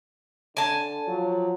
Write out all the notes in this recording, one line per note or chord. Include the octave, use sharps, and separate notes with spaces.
D3 G#5 A5
F3 F#3